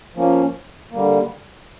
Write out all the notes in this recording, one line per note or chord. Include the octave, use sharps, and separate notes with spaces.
F3 A#3 C#4
D3 G3 A#3